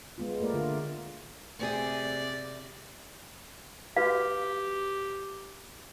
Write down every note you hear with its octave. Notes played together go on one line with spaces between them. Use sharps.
G#3 B3 F4
A3 A#3 A#4 D5
D3 F4
C3 A3 C4 G#4 D5
F#4 G4 B4 F5